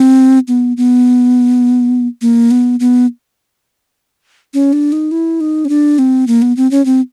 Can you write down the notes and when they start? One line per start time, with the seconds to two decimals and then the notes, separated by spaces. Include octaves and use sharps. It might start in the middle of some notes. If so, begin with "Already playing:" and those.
Already playing: C4
0.48 B3
0.77 B3
2.21 A#3
2.51 B3
2.80 B3
4.54 C#4
4.73 D4
4.92 D#4
5.11 E4
5.41 D#4
5.65 C#4
5.69 D4
5.98 C4
6.27 A#3
6.42 B3
6.57 C4
6.71 C#4
6.85 C4